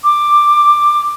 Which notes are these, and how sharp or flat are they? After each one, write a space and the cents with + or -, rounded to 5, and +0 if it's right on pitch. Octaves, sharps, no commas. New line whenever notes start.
D6 +10